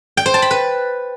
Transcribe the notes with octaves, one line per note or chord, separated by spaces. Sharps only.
G5
C5
A5
B5
B4